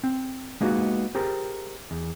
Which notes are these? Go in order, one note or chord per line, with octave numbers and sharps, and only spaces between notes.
C4
G#3 A#3 B3 D#4 F#4
G4 G#4 A#4 C5
E2